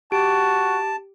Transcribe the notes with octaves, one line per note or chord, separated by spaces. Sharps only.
F#4 G4 A5 D7